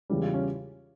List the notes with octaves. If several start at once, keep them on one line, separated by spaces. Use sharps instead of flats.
E2 C#3 E3 G3
F4
C#4